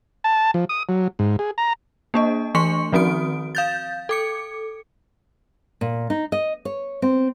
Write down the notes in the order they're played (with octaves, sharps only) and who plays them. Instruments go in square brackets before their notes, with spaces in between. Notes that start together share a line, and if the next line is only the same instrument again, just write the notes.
[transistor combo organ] A5
F3
D#6
F#3
G#2
G#4
A#5
[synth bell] A#3 D4 D#5
E3 A3 D4 C6 C#6 C#7
D#3 F3 C4 F#4 D#6 D7
F5 G6 A6
A4 D6 C#7
[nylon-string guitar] A#2
D#4
D#5
C#5
C4